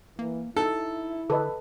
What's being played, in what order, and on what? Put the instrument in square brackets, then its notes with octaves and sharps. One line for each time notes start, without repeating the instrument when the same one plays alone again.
[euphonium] E3 [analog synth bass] A#3
[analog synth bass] D#4 [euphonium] E4 [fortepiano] A4
[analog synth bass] D3 [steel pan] A4 B4 D#5